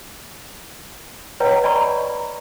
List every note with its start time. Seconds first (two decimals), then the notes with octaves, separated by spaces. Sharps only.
1.40 B4 C#5 D#5 F#5 G5 A#5
1.64 D5 D#5 G#5 A#5 B5 C#6